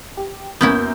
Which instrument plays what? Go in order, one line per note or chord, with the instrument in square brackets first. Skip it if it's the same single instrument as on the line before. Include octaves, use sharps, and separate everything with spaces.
[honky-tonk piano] G4
[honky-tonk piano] F#2 A#3 G6 [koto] B3 C#4 E4